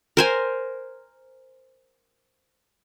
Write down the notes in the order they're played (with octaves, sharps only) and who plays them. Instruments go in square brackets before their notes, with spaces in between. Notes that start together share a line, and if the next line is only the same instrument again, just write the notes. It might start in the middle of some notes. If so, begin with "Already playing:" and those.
[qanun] A#4 C5 G#5